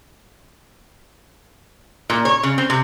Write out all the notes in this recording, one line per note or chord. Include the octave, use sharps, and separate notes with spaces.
A#2
C#5
C#3
C4
C3